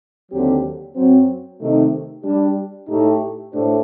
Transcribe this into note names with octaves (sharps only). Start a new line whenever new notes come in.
D#2 D3 F#3 C4 G4
F#2 F#3 C4
C3 D#3 A3 D#4
G3 D4 G4
A2 A3 D#4 G4
A2 A3 D4 G4 C5